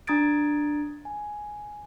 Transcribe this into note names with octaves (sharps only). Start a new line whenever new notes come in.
D4 A#5 D#6 G#6 A6 D7
G#5